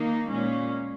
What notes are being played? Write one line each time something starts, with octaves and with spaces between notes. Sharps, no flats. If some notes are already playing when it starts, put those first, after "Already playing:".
Already playing: D#3 A#3 D#4
A#2 G#3 C#4